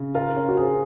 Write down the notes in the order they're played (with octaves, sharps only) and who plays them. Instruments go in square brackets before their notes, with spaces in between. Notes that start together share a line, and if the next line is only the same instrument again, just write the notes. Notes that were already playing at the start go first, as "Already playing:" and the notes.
Already playing: [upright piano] C#3
[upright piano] F4 [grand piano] A#4
[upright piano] C#4
[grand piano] F#4
[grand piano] G#4 [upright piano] C5